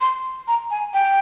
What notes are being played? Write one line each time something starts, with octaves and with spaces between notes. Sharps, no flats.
C6
A#5
G#5
G5